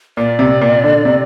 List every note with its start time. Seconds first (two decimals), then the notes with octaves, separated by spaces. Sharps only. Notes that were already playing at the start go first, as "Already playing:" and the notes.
0.17 A#2 D5
0.39 C3
0.61 A#2
0.83 D3
1.05 C3